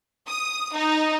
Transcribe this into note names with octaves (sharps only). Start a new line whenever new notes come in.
D#6
D#4